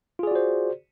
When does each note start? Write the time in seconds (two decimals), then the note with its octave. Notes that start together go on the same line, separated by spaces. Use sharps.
0.19 F4
0.23 G#4
0.27 D5
0.31 F#4
0.35 C5